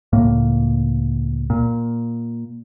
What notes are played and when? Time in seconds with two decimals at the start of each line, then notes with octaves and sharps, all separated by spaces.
0.13 C#2 A2 A#3
1.50 A#2